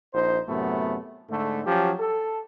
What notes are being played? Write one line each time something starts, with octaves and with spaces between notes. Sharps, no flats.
A#1 D#4 C5
F#2 A2 C3 A3 B3
G#2 D3 A3
F3 F#3 C#4 G4
A4